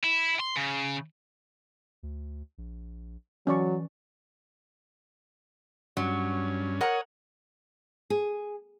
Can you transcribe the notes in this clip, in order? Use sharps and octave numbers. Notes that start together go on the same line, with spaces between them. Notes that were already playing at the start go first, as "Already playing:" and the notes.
E4
C6
C#3
D2
A#1
E3 F#3 C#4 D5 C#6
G2 F#3 C#4
A#4 C#5 F#5 D#6
G#4